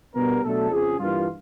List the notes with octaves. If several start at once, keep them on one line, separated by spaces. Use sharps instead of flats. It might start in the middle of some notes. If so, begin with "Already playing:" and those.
B2 G3 B3 D4 A#4
B2 F#3 A3 D4 A4
F2 C#3 F3 G#4
G2 E3 G3 A#3 F4